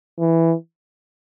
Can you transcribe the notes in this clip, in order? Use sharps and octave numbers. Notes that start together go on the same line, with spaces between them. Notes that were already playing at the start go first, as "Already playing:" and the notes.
E3